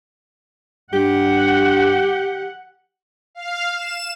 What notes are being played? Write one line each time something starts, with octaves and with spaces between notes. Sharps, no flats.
G2 G4 F#5
F5
E7